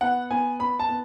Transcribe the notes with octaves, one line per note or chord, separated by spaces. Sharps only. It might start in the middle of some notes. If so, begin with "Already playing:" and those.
B3 F#5
B3 G#5
B3 B5
A5
B3